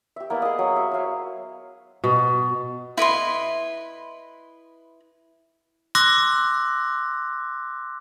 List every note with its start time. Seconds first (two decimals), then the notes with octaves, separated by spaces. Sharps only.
0.16 G4 E5
0.30 A#3 B3 E4 D5
0.42 G#4 D#5
0.59 F#3
0.76 E5
0.91 F#4 C5 F5 G#5
2.04 B2
2.97 E4 B4 D#5 C6
5.95 C6 D6 E6 F#6 A#6